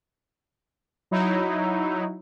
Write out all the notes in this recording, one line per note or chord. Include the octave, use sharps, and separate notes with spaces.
F#3 D#4 E4